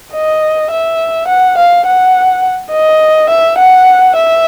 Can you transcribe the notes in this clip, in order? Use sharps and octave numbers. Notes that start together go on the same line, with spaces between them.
D#5
E5
F#5
F5
F#5
D#5
E5
F#5
E5